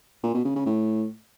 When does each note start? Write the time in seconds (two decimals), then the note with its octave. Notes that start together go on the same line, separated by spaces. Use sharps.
0.24 A#2
0.34 B2
0.45 C#3
0.56 C#3
0.66 A2